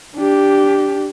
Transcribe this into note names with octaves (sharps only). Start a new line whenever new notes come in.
D4 G4